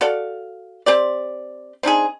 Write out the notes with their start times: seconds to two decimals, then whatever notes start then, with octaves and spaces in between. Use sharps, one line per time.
0.01 F#4 A4 D5 F5
0.86 C4 G4 D5
1.83 C4 D4 D#4 G#4